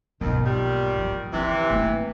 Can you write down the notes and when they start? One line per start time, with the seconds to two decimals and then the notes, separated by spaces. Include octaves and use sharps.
0.21 B1 F2 G#2 D#3
0.45 A#2 D#3 G3
0.97 F3
1.33 C3 E3 E4
1.70 A3 A#3